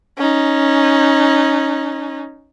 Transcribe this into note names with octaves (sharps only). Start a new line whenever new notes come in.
C#4 D#4